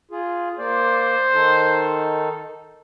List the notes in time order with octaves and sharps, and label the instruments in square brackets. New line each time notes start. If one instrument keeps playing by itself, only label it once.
[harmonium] F4 G#4
[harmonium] A#3 D5 [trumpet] C5
[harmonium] D#3 D#4 A4